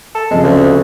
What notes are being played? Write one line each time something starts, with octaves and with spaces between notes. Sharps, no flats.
A4
C#3 F3 G#3 C4
D2